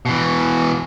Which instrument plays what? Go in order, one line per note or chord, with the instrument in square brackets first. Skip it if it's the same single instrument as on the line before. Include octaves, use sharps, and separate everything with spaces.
[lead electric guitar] B2 E3